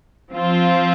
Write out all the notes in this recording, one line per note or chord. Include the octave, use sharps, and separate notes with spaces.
F3 C4 F4